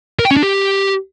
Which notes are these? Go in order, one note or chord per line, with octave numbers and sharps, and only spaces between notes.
A#4
G5
C#4
D4
G4